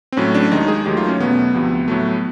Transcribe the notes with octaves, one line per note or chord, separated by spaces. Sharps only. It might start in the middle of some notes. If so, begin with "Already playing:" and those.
C4
A2 F#3 A3 C#4
D4
D#2 D#3 G#3 D#4
G#4
D#2 D#3 F#3 A3 G4
F4
C#4
E2 B2 F#3 A3 B3
D2 C3 F3
A2 F#3 A3